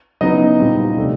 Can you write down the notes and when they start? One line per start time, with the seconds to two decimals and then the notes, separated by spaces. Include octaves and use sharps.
0.21 C#3 F#3 B3 D#4 E4 D#5
0.59 A#2 G3 C4
0.97 C3 F3 A3 D4